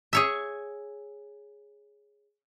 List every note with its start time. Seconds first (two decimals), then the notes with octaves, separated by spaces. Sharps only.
0.13 G#4 C#5 E5